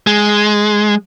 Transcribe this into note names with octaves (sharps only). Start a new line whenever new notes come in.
G#3